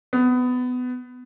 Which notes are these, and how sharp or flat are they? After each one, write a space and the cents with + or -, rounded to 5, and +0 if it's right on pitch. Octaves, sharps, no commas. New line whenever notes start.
B3 +20